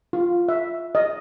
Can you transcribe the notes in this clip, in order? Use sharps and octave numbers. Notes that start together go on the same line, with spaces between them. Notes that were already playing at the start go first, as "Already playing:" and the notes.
F4
E5
D#5